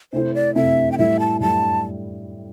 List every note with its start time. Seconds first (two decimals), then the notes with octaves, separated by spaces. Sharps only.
0.13 C3 A3 C4 E4 C5
0.34 D5
0.55 C3 A3 C4 E4 E5
0.92 G5
0.98 A2 G3 E4 E5
1.20 A5
1.40 A2 G3 E4 A5